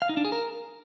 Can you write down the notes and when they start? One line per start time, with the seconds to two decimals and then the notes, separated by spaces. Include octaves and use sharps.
0.02 F5
0.09 D#4
0.17 D4
0.25 G#4
0.32 A#4